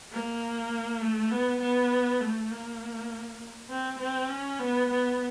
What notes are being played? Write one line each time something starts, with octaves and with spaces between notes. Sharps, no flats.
A#3
A3
B3
B3
A3
A#3
C4
C4
C#4
B3
B3